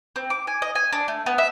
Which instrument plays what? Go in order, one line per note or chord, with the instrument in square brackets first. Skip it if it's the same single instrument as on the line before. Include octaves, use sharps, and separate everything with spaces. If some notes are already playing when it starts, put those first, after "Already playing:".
[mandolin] C4
D6
G#5
D#5
G#5
D4
A3
B3
E5